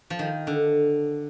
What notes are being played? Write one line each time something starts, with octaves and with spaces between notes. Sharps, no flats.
F3
D#3
D3